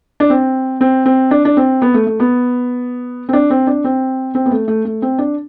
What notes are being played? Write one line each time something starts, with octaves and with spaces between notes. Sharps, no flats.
D4
C4
C4
C4
D4
D4
C4
B3
A3
A3
B3
C4
D4
C4
D4
C4
C4
B3
A3
A3
A3
C4
D4